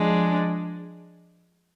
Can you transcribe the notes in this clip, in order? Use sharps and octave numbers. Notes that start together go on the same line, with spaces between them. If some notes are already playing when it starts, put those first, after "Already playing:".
Already playing: F3 G#3 D4